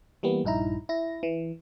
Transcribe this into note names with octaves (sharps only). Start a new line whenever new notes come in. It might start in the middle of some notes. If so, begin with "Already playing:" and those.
E3 G3 A#3 B3
A#1 G2 D#4 E4 A#5
E4 A#6
E3